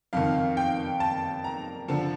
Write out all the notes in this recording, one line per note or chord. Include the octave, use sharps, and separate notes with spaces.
F2 D#3 F5
G5
A5
A#5
D3 F3 A5